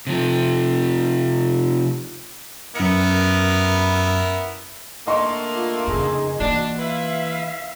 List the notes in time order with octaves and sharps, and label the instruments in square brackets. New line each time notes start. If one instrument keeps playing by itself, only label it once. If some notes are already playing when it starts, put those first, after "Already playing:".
[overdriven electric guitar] C3 F3
[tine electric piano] F#2 C#7 [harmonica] B3 E4 A#4
[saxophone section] D3 A3 A#3 [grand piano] D#5 C6 C#6
[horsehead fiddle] F4
[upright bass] F2 C#3 [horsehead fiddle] D#4 G#4
[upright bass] E3 A#3 [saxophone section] D4 [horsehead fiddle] F#4
[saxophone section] E4 B4 [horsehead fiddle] E5 F5